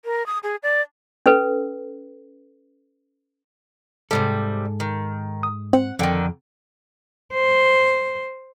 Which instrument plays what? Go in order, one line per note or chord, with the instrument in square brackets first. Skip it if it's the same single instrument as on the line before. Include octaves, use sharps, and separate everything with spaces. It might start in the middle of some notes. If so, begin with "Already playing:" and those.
[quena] A#4
D#6
G#4
D5
[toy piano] C#4 A4 B4
[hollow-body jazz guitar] G#2 A4 [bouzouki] C3 E3 G3
[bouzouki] D#3
[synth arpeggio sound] D#6
[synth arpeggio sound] C4 [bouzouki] F#5
[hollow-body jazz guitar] F2 F#5 G5 [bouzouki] D3 D#3
[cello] C5